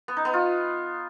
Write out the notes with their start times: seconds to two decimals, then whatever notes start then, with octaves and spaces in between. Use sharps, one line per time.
0.08 B3
0.17 D#4
0.25 B3
0.34 F4